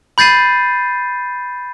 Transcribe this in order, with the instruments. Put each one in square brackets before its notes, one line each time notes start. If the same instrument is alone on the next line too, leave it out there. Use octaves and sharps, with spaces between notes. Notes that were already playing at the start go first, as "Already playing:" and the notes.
[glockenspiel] B5 G6 A6 C7 D#7